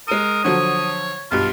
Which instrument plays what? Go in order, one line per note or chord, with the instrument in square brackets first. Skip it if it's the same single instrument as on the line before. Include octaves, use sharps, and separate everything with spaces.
[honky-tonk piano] G#3 D#7 [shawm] A#4 [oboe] D#6
[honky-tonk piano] D3 F3 F#3 [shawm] C#5
[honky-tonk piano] B1 G2 [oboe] F4